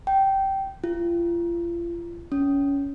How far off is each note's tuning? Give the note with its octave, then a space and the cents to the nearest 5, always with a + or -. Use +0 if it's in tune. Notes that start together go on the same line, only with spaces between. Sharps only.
G5 -15
F4 -35
C#4 +20